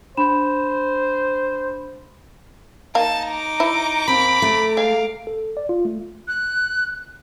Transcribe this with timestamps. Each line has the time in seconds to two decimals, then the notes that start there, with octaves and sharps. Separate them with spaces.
0.17 D4 C5 B5 E7
2.95 A#3 D#4 F5 A5
3.29 A#5 D6
3.60 E4
4.08 D#2 C4 B5
4.42 A3
4.77 G#3 F5
5.27 A4
5.57 D5
5.69 F4
5.85 A3
6.28 F#6